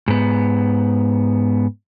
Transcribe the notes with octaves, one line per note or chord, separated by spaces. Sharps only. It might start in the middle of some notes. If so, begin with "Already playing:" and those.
G#2 B3